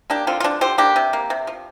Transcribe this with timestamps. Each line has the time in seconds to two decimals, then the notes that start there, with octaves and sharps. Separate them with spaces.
0.10 A#3 D4 G4
0.27 D3 C4 F4
0.40 F4
0.44 F3 D4
0.61 D3 G4 C5
0.78 A#3 D4 G4
0.96 C3
1.13 A#3
1.30 C3
1.47 F3